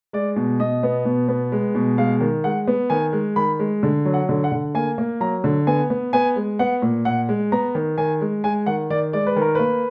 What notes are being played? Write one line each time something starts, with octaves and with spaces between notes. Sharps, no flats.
G#3 D5
B2
B2 D#5
B3
B2
B3
G#3
B2
G#3 F5
D#3
G#3 F#5
B3
D#3 G#5
G#3
D#3 B5
G#3
D3
F#3
F#5
D3
F#5
D3
A#3 G#5
A#3
F#3 A#5
D3
B3 G#5
B3
B3 G#5
G#3
B3 F#5
A#2
A#2 F#5
G#3
B3 A#5
D#3
D#3 G#5
G#3
G#3 G#5
D#3 F#5
D#3 D5
G#3 D5
B4
D#3 A#4
A#3 B4